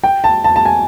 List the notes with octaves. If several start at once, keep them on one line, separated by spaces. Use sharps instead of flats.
G5
A5
A5
A5
G#5